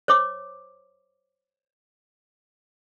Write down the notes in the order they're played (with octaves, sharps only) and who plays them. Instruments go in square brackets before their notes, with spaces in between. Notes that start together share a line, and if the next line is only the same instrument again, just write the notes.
[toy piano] C5 C#5 D6